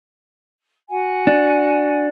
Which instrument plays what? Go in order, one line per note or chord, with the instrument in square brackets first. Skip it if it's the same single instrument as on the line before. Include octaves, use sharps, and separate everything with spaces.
[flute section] F#4 F#5 G#5
[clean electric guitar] D4